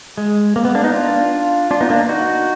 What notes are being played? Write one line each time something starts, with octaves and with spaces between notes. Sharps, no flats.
G#3
A#3
B3
A#3 D4
B3 D#4
D4 F4
D4 F4
B3 D#4
A#3 D4
D#4 F#4